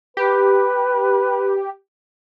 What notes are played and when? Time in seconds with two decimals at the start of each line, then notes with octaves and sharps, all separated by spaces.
0.17 G4 B4